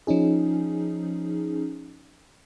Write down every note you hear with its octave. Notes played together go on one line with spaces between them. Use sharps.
F3 C#4 D#4 G#4